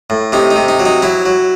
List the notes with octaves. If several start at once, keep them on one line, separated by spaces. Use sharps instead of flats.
A2
C3 D#4
D#4
C3
D#4
F#3
D#4
F#3 E4
F#3